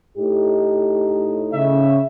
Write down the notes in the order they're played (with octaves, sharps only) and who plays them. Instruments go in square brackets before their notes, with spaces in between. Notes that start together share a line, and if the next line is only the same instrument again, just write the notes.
[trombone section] A2 D#4 [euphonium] G4
[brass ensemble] C#3 [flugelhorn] E5